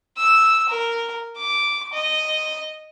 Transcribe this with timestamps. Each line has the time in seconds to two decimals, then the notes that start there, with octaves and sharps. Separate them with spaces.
0.18 E6
0.69 A#4
1.37 D6
1.93 D#5